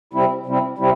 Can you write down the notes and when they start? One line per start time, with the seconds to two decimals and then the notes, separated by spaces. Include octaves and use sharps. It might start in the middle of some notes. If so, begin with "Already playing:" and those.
0.13 C3 G3 C4 E4
0.46 C3 G3 C4 E4
0.78 C3 G3 C4 E4